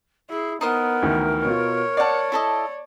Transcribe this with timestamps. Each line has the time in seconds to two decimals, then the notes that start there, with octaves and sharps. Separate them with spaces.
0.30 E4 G#4
0.61 B3 D#4 A#4 C5 D#6
1.02 D2 D#3 E3
1.45 B2 F4 C#5
1.97 D5 F5 F#5 A5
2.32 E4 A4 D#5